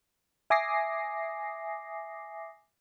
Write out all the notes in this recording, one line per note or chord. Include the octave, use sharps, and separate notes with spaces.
E5 G#5 D6 D#6 A#6 C7